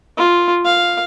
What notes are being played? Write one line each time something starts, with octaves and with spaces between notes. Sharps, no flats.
F4
F5